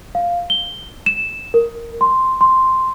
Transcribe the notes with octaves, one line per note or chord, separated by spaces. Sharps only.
F5
G7
E7
A#4
C6
C6